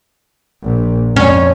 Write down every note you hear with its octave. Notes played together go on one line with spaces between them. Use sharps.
A#1
F2 C#4 C#5